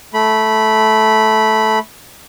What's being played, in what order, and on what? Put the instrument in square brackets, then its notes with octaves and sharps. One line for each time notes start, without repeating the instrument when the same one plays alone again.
[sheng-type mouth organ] A3 B5